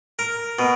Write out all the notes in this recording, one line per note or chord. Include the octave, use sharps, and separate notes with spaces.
A#4
B2